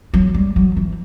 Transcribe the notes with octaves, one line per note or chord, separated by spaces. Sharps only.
F#3
G3
F#3
E3